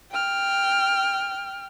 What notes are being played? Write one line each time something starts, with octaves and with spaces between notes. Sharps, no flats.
G5 F6